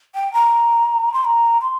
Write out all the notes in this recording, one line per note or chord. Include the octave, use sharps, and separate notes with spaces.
G5
A#5
C6
A#5
C6